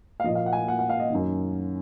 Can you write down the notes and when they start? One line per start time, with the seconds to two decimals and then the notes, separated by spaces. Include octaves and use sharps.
0.20 F5
0.24 F3 D#5
0.28 A#2
0.35 F5
0.46 F#5
0.53 G#5
0.57 F#5
0.68 F#5
0.79 F#5
0.89 F5
1.00 D#5
1.10 F#2 D#3